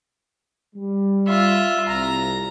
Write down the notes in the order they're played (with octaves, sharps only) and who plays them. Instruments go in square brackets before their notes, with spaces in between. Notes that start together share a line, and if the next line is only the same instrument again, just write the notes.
[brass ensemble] G3
[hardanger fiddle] F4 E5
[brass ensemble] C2 [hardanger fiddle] A#5